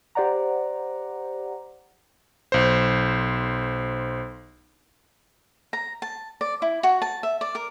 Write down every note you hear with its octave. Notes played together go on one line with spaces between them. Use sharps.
G4 C5 D5 F#5 A#5
B1 C5
A#5
A5
D5
E4
F#4
A5
E5
D5
A#4